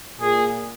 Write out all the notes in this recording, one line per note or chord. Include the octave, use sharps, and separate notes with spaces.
A#2 G#4